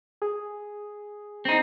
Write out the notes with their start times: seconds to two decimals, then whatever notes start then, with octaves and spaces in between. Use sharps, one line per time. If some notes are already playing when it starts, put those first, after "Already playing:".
0.22 G#4
1.45 C4 D#4